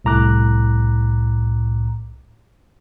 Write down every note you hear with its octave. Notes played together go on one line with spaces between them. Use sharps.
C2 A2 A#5 D6 F#6